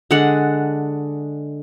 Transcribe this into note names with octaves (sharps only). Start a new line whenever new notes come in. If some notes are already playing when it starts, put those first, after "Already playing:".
D3 G#3 D4 F#5